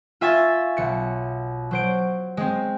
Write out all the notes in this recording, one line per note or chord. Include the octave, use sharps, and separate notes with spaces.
F4 E5 G#5 C#6 A6
B1 C#7
F#3 C5 D7
G#3 C4